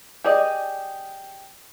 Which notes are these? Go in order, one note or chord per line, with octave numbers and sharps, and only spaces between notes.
G4 G#4 D5 D#5